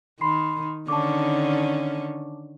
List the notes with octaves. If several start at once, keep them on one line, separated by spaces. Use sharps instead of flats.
D#3 B5 C6 C7
D3 D#3 C#4 A5 C#6 D6